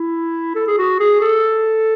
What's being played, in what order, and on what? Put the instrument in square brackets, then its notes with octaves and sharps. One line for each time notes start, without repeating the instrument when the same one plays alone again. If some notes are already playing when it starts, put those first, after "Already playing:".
Already playing: [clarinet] E4
A4
G#4
F#4
G#4
A4